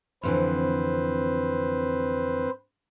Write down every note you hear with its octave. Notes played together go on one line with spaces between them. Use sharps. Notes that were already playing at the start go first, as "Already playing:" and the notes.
F2 D3 E3 C4 B4 C5